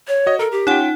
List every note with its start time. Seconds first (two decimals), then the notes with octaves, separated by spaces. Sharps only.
0.08 C#5
0.26 F#4 D#5
0.39 A4 A#4
0.52 G4
0.67 C#4 D#4 F4 F#5 G5